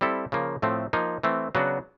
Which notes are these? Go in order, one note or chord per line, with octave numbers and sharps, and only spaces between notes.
G3 C4 E4 A4
C#3 F3 A#3
A2 F3 A3 C4
F3 A#3 D#4
E3 A3 C4
C#3 F#3 B3 D4 F#4